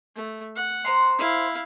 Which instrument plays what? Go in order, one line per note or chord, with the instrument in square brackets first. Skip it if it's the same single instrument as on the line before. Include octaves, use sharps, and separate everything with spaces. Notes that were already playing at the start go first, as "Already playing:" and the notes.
[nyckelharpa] A3
F#5
[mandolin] C5 A#5 C6
[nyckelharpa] E4 F5